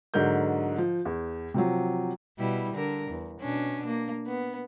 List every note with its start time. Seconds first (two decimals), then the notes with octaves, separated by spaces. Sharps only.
0.14 G#2 D3 F#3 A#4 G6
0.78 F3
1.05 E2
1.54 C3 F3 F#3
2.38 B2 G3 E4
2.74 D3 A#4
3.11 E2
3.41 B2 C#4 D4
3.86 A#3
4.27 B3